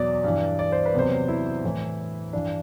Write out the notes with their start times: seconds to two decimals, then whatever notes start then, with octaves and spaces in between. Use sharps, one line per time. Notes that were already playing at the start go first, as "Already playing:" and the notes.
Already playing: E2 B2 F#3 D5
0.24 G2 E3
0.59 D5
0.72 C5
0.85 B4
0.94 E2 C3 F#3 C5
1.28 E4
1.63 A2 E3
2.33 G2 E3 D4